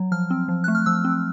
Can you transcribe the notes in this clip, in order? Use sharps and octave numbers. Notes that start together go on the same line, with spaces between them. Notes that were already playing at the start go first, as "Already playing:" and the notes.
Already playing: F#3
F3 F6
C4
F3
A3 F#6
F6
F3 E6
C4